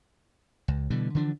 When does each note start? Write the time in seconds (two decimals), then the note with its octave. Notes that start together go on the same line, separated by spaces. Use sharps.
0.68 C#2
0.90 B2 D3 E3 G3
1.15 D3 E3 F3 D4